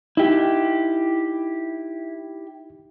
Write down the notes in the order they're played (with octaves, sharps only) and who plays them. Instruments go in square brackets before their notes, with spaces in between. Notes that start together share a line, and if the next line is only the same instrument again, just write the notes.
[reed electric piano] D#4 [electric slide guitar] E4 G4